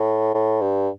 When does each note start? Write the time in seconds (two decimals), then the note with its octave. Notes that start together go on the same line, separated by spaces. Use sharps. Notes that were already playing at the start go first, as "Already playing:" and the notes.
Already playing: A2
0.34 A2
0.61 G2